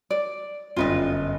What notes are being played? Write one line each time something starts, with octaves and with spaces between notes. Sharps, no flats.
D5
G1 F#2 F4 B4 D#5